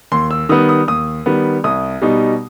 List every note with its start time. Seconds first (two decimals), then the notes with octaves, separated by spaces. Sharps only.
0.12 D#2 C6
0.31 E6
0.49 D#3 G3 B3 D#6
0.69 D#6
0.88 D#2 D#6
1.26 D#3 G3 B3
1.64 C2 D#6
2.02 B2 G3 D#4